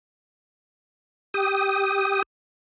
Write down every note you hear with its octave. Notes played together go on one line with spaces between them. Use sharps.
G4 D#6